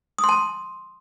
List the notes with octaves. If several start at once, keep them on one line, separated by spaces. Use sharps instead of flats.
D#6
C6
A5